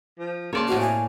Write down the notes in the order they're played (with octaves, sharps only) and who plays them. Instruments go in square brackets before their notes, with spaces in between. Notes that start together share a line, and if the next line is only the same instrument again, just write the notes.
[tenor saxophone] F3
[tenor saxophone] C#3 [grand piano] A#3 C6 [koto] C#5 D5 A5
[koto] A2 F5 [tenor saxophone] C3 [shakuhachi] F#4
[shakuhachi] G#5